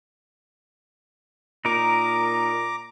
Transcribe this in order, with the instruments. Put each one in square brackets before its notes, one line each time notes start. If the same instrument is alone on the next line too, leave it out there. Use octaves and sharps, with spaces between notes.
[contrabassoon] A#2 [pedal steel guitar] D#4 A#4 [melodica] A#5 D6